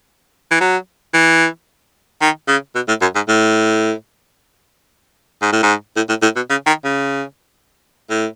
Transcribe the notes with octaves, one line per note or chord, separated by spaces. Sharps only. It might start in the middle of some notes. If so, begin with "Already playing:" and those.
E3
F#3
E3
D#3
C#3
B2
A2
F#2
G#2
A2
G#2
A2
G#2
A2
A2
A2
B2
C#3
D#3
C#3
A2